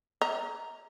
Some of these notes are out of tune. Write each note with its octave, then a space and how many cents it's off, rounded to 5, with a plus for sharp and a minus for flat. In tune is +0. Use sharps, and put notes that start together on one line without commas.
D#5 +45 A#5 +0